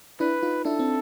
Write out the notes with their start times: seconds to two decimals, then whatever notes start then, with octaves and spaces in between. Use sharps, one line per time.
0.20 D4 E4 B4
0.43 D#4 F4
0.65 D4 E4 A4
0.79 C4 D4